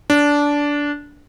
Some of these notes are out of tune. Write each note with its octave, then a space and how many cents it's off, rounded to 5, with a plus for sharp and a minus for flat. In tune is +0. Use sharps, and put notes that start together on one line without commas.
D4 -15